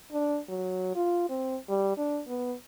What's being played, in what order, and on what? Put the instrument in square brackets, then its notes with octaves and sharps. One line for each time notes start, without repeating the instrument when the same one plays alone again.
[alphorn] D4
F#3
F4
C4
G3
D4
B3